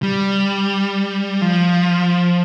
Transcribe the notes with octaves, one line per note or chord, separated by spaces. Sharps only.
G3
F3